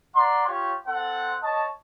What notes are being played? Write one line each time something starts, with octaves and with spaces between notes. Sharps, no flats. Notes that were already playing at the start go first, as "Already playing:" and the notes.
D5 F#5 A#5 C6
F4 G4 C#5
C4 A4 C5 F#5
C#5 D#5 A5